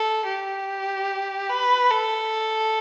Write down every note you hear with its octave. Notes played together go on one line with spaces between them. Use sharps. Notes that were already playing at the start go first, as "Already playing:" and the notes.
Already playing: A4
G4
B4
A4